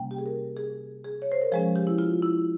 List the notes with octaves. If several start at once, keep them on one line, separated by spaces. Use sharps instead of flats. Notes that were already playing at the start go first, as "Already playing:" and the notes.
Already playing: C3 G3 A#3 C#4 G5
G4
G#4
A#4
G#4
G#4
C#5
C5
A#4
F3 G#3 C#4 G#4
G4
E4
F4
E4